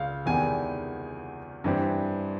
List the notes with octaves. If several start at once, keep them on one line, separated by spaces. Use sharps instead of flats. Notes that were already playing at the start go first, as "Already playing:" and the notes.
Already playing: C#2 F5
E2 C3 D#3 G#3 B3 G#5
G2 E3 G3 C4